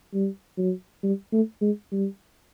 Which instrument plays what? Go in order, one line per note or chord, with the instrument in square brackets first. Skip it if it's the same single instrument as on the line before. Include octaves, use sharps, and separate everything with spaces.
[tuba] G3
F#3
G3
A3
G#3
G3